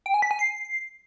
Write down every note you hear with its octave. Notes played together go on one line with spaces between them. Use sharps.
G5
G#5
B6
G#5
C7